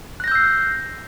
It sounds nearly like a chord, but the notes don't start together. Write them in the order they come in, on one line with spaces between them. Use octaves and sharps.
F#6 A#6 G6 E6 C7